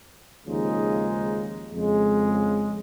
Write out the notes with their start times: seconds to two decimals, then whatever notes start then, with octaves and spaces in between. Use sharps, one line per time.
0.47 D#2 C#3 F3 G#3 D#4
1.74 F2 C#3 G#3